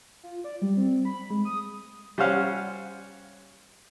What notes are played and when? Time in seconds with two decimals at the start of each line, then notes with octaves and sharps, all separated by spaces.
0.23 F4
0.44 D5
0.62 G3
0.77 C4
1.05 B5
1.30 G#3
1.45 D#6
2.18 G3 C#4 C5 F5 F#5